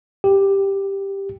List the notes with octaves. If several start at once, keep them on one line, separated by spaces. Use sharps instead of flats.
G4